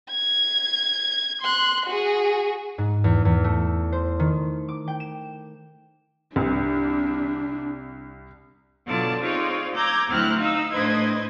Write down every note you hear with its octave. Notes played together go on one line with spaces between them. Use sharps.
G#6
C6 F#6
F#4 G#4
G#2
E2
E2
A3
C5
D#3
D6
G5
E7
C2 D4
B2 D3 F#3 F4 D5 A5
C4 D#4 F4 G#4 C#5 D5
A#5 D6 E6 G6 G#6
D2 F#3 C4 E4 F6 F#6
D#4 F5 E6
A2 D4 B4 C5 D#5 G#6